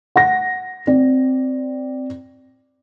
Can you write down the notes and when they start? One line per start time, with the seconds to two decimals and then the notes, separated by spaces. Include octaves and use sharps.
0.16 F#5 A#6
0.87 C4 D5